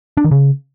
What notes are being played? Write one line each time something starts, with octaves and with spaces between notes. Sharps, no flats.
D4
D#3
C#3